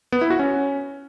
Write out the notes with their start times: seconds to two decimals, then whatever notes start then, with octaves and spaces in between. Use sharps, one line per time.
0.12 B3
0.21 E4
0.30 F#4
0.39 C#4